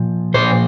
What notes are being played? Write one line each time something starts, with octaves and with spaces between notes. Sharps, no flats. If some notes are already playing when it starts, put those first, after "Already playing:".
Already playing: A#2 F3
A#2 F3 C5